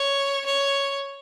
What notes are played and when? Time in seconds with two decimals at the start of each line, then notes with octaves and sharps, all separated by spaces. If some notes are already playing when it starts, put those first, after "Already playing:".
Already playing: C#5
0.46 C#5